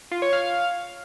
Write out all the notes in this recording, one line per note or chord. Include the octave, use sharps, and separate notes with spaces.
F4
C#5
F5